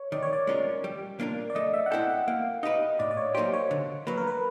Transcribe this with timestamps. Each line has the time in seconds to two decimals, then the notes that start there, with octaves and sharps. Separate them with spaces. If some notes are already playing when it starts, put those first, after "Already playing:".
Already playing: C#5
0.12 D#3 D5
0.23 C#5
0.33 D5
0.47 G#3 C#4 F4 A#4
0.84 G3
1.20 A#3 D4 F4 A#4
1.50 D5
1.55 A3 D#5
1.74 E5
1.86 F#5
1.91 C4 E4 A4 G5
2.09 F#5
2.27 A#3 F5
2.63 D#4 G4 B4 D#5
2.99 A2 D5
3.11 D5
3.17 C#5
3.35 F#3 A#3 D#4 G4 C5
3.53 C#5
3.71 D3
4.07 F#3 A#3 B4
4.17 A#4
4.27 B4